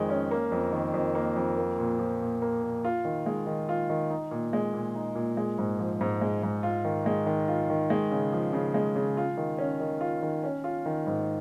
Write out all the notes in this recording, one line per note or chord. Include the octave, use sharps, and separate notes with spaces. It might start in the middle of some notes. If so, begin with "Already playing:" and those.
Already playing: F2 D#3 G#3
C#4
A#3
F2
D#3
F2
A#3
F2
A#3
A#2
F3
A#2
A#3
A#2
F4
D#3
G#3
D#3
F4
D#3
D#4
A#2
G#3
A#2
D#4
A#2
G#3
G#2
F3
G#2
G#3
G#2
F4
D#3
G#3
D#3
F4
D#3
G#3
C#3
F3
C#3
G#3
C#3
F4
D#3
C#4
D#3
F4
D#3
C#4
F4
D#3
G#2